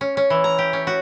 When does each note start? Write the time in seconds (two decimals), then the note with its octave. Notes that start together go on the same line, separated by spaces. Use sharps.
0.01 C#4
0.17 C#4
0.30 E3
0.44 A#5
0.59 G4
0.73 C#4
0.87 F#4